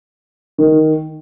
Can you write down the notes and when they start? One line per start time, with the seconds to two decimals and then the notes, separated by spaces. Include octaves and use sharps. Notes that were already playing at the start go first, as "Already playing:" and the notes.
0.58 D#3